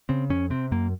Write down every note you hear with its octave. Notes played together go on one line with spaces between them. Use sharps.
C#3 C4
F2 C#4
C3 C4
F#2 A#3